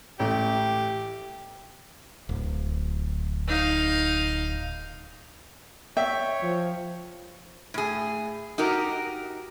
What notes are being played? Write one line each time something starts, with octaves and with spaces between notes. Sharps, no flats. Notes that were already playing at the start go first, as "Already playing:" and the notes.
A1 G4
D1
D#4 F5
C#5 E5 G5
F3
A2 G#4
D#4 F#4 G4 A#4